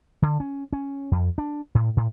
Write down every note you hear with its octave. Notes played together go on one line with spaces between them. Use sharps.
D3
C#4
C#4
F2
D4
A2
A2